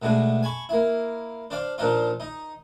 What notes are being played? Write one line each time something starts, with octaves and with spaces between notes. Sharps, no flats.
B2 G#3 A3 D4
G#5 A5 B5 C#6
A#3 E4
D4 C5 D5 F5
A#2 F3 D4 D#4 F4
D#4